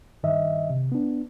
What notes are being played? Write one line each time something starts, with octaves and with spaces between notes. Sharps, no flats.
G2 D#3 D#5 E5
C3
B3 D4